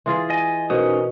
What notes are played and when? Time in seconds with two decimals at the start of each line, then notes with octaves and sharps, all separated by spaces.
0.06 E3 F4 G#4 C6 D#6 A6
0.30 D#5 G#5
0.70 B2 C#4 D#4 F#4 A#4 C5 D#6